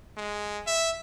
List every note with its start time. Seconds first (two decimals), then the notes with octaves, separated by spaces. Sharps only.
0.17 G#3
0.67 E5